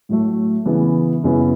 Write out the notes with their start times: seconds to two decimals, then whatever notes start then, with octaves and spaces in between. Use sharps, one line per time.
0.09 A2 F#3 A3
0.66 C#3 E3 B3 E4
1.24 F#2 C#3 F#3 B3 E4